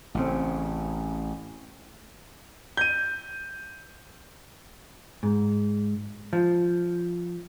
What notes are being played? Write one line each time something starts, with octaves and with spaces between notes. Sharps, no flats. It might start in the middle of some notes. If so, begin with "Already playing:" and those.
A1 C#3 A3 C4
G6 D#7
G#2
F3